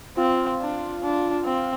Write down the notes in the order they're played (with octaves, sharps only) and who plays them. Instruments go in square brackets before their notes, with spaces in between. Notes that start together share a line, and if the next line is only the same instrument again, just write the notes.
[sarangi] C4 [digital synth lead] F4
[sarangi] D4
D4
C4